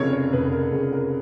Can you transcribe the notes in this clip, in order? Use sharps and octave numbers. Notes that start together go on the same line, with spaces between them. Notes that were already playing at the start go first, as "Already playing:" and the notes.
Already playing: F1 F2 C#3 G#4 A#4 C#5
C#5
F1 B4
A#4
F2 C#3 G#4
A#4